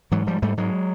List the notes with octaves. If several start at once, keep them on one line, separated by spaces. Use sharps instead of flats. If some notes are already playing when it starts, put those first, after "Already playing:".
G#2 E3 F#3
G#2 F3 G3
G#2 G3 A3
G#2 F#3 G#3